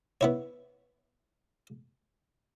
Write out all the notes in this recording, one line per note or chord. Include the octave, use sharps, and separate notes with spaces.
B3 E4 C#5